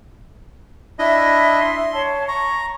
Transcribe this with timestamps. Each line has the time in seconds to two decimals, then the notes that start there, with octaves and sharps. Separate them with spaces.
0.99 D4 E4 D#5 E5
1.60 C6
1.93 C#5 A5
2.28 A#5 C#6